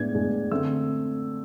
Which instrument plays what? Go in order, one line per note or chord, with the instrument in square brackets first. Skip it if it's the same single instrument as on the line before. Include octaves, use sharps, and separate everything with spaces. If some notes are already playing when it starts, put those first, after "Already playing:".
Already playing: [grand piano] A2 G#3 B3 D4 G#6
A2 G#3 B3 D4
D3 A3 C4 E6